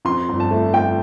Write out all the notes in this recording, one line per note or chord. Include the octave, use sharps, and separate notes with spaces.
F2 C6
G1
A5
A3
A3 G5